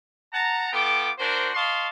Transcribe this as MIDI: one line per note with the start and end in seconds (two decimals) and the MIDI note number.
0.33 0.69 78
0.33 0.69 81
0.33 0.69 82
0.73 1.11 59
0.73 1.11 65
0.73 1.11 69
0.73 1.11 79
0.73 1.11 86
1.19 1.51 62
1.19 1.51 66
1.19 1.51 70
1.19 1.51 72
1.55 1.89 75
1.55 1.89 77
1.55 1.89 81
1.55 1.89 84
1.55 1.89 85